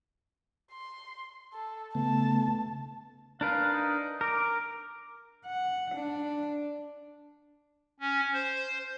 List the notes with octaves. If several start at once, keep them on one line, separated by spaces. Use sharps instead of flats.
C6
A4
C#3 A3 B3 A5
D4 A#4 B4 F5
D#4
A#4 D6
F#5
D4
C#4
C5